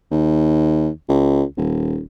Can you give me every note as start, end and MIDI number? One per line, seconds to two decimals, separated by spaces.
0.11 0.89 39
1.09 1.43 37
1.57 2.01 27